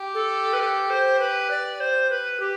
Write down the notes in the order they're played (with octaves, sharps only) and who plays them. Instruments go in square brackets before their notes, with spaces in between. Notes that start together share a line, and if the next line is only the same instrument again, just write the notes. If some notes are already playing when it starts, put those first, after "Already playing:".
Already playing: [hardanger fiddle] G4
[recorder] A4
B4
A4
C5
B4
D5
C5
B4
G4